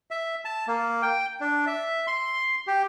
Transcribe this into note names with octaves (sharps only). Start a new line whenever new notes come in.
E5
A5
A#3
G5
D4
E5
C6
G4